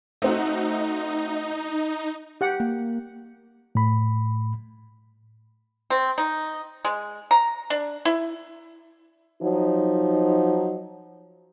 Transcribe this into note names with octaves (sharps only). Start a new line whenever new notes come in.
A3 C4 D#4 F#4
G4 F#5
A#3
A2 B5
C4
D#4
G#3
A#5
D4
E4
F3 F#3 D#4